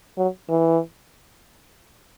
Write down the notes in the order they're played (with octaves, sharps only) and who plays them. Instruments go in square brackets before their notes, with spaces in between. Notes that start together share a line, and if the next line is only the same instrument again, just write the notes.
[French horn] F#3
E3